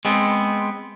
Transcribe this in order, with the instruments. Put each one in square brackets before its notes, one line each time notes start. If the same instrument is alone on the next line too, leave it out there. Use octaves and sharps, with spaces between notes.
[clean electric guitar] G#3 B3 C4